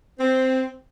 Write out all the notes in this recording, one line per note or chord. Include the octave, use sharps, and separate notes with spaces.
C4